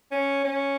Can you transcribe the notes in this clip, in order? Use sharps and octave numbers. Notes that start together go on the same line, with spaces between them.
C#4
C#4